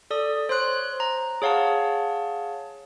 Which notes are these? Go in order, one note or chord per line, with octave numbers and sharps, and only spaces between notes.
A4 D5 D#6
C5 C#5 C6 F#6
A#5
G#4 C#5 F5 F#5 A5